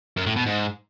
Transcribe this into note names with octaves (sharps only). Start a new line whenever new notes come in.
F#2
A2
B2
G#2